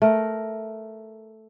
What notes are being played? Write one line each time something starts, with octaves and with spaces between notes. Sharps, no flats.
A3 A#4